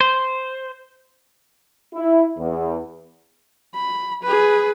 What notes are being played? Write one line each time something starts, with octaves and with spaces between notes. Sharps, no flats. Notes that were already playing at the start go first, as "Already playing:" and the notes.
C5
E4
E2
B5
G#4 B4